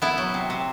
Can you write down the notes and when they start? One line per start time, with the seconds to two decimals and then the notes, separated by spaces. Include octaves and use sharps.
0.02 B3 E4
0.18 F#3
0.34 C3
0.50 C3